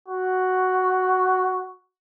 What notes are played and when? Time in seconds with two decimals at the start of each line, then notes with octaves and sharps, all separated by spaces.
0.08 F#4